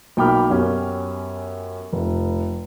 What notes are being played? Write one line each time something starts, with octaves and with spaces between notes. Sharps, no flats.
B1 A#3 G5 B5 D6 F6
F#2 B3 C#4 G4
F1